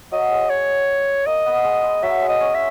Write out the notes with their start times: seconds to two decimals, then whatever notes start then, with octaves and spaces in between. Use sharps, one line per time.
0.12 F#3 D#5
0.32 G#3
0.50 C#5
1.27 A#3 D#5
1.46 B3
1.64 G#3
1.83 G#3
2.02 F#3 E5
2.22 G#3
2.29 D#5
2.40 C#4
2.54 E5